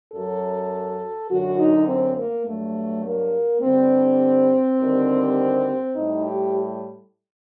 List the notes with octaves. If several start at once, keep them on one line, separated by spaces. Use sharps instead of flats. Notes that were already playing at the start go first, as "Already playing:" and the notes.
F#2 F#3 A4
F#2 D3 F#3 F#4
D#4
C4
A#3
G2 F#3 A3
A#3
G2 D3 G3 C4
D#2 D3 G3
A2 G3 D#4
G4